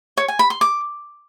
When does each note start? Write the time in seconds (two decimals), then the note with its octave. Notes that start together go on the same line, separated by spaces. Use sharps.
0.17 C#5
0.28 G#5
0.39 B5
0.50 C6
0.61 D6